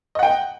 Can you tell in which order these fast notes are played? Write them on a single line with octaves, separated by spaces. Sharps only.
D#5 F#5 G5